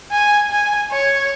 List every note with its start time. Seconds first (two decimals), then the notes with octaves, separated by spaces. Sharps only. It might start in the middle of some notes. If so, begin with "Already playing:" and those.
0.11 G#5
0.50 G#5
0.92 C#5